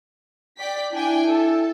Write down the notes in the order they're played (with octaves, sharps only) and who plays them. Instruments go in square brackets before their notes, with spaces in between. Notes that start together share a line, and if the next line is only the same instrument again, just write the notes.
[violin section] D5 G5 B6
[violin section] D4 G5 G#5 [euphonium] E4
[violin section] A4